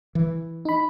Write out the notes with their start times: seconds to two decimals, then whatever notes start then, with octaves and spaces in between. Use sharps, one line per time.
0.15 E3
0.65 D#4 B5